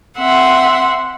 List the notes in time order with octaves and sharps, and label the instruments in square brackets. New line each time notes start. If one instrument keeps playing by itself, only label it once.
[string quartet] C4 E5 F#5 C6